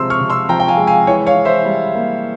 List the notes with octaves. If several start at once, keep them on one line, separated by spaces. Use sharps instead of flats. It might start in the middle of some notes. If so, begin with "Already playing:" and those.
Already playing: C3 F3 G#3 C6 E6
C#6 F6
C3
C6 E6
F3 G5 A#5
G5
F5 G#5
G#3
F5 G#5
E3 C#5
C#5 F5
E3
C5 E5
G3
A#3